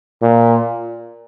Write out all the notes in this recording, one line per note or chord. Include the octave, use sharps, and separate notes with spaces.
A#2